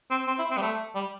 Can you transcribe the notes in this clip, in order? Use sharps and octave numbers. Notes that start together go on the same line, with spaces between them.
C4
C4
E4
C4
G3
A3
G3